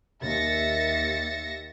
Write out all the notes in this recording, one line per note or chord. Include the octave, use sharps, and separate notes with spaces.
D#2 E5 A6 A#6 C#7